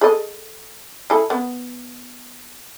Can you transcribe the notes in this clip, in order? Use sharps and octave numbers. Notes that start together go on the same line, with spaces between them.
G#4 A4 D#5
E4 G#4 A4
B3